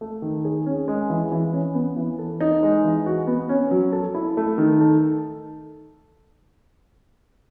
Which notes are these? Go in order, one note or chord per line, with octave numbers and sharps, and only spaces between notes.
A3
D#3
G#4
C#4
G#3
E3
E3
C#4
B3
E3
A4
D#4
G#3
E3
F#4
B3
C#4
F#3
A4
E4
A3
D#3
A4